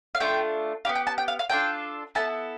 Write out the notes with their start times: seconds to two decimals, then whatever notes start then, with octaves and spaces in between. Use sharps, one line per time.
0.15 F5
0.20 A3 D4 F4 G5
0.85 D4 G4 F5
0.89 B3
0.95 G5
1.07 A5
1.18 G5
1.28 F5
1.39 F5
1.50 D4 F4 A4 G5
2.15 B3 E4 A4 A5